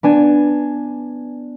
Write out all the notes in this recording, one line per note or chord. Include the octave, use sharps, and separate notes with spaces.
B3 D4 G#5